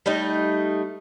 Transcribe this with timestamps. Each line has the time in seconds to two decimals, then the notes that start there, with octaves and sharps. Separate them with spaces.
0.06 G3 A3 D#4 D#5